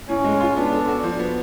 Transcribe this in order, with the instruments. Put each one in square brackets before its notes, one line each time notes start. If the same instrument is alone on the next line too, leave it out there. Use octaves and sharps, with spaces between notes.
[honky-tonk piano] A2 [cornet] C#4
[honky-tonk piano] G#3
F4
[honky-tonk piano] B3 [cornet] D4
[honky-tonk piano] A4
F#4
F3
B3